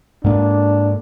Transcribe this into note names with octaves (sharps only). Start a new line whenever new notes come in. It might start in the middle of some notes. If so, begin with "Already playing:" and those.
G#2 A#3 D4